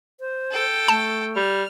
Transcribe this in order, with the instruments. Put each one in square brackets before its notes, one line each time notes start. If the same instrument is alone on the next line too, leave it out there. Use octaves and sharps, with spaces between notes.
[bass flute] C5
[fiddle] A4 G5
[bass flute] A3 [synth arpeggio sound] A5
[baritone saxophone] G3 [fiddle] F6